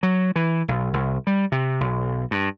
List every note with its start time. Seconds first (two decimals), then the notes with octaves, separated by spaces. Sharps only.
0.03 F#3
0.36 E3
0.68 B1
0.94 C2
1.27 G3
1.52 C3
1.80 B1
2.31 G2